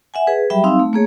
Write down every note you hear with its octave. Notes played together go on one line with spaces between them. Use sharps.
E5 F#5 G#5
G#4 B4
F#3 G3 G4 E5 G5 B5
C4 D#4 F5 E6
A3
A3 A#3 G#4 C#5